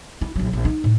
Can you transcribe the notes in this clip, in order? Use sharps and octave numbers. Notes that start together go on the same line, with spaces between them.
E4
A#1 F#3
A#1
D#4
A2